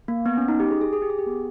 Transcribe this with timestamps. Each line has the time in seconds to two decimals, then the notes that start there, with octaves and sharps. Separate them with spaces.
0.08 A#3
0.26 B3
0.37 C#4
0.48 D#4
0.60 G4
0.71 G#4
0.81 G#4
0.93 G#4
1.02 G4
1.10 G#4
1.19 G4
1.26 B3